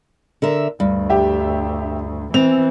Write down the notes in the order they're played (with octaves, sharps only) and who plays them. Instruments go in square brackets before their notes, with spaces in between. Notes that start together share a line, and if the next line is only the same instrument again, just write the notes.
[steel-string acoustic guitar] D3 A#4 E5
[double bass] D2 [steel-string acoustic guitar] G2
[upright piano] G4 E5
[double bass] E3 [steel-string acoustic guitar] C4 [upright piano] F7